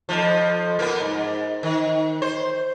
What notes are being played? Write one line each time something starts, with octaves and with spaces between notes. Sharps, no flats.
F2 B2 F3
A#3 B3
G#2
D#3
C5